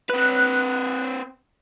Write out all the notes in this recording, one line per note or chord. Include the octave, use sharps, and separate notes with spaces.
C4 B4 F#6